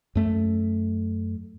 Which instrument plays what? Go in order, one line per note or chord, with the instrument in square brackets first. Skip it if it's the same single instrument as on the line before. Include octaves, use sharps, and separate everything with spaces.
[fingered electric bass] F#2 A3